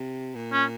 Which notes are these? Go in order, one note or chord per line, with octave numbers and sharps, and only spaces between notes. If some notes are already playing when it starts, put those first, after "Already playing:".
Already playing: C3
A#2
C#4